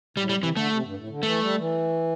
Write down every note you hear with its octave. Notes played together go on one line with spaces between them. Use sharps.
A2 G3
G3
C3
E3
D3 A3
C3
G2
A2
D3
E3 A3
G3
E3